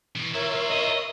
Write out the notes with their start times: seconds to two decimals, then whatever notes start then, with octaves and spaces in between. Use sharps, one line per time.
0.16 B2 E3
0.35 E4 F4 A#4 C#5 E5
0.71 D#5